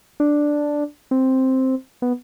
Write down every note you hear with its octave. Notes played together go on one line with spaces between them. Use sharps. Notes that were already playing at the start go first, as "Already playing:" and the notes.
D4
C4
B3